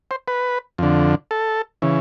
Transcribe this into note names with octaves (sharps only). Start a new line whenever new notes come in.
C5
B4
F2 D3
A4
C#3 E3